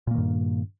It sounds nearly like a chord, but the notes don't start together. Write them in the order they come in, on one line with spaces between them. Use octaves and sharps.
A#2 A#3 D#3 G2